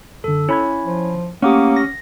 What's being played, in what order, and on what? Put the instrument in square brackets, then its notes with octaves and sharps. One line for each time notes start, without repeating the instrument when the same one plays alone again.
[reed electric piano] F#2 D3 [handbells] A4
[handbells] C#4 E4 C#5 [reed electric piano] G#5 B5 G#6
[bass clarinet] F3
[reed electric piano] A3 G4 [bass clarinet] A#3 [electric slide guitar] C#4 [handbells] F#5 D6 D#6
[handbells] A#6